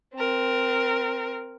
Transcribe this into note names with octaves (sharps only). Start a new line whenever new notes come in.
C4 A#4